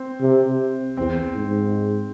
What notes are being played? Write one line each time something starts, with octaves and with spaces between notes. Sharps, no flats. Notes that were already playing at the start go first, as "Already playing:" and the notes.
Already playing: C4
C3
E2 C4
G#2